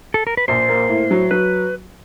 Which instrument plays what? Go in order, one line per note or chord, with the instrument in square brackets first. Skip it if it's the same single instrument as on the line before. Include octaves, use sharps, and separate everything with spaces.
[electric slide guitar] A4
A#4
B4
[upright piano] A#1 [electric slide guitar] C5
[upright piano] A#3
A2
F#3
[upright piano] F#3 [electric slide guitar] B4